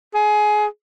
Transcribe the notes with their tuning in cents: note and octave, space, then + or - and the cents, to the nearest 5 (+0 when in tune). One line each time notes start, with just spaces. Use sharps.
G#4 +20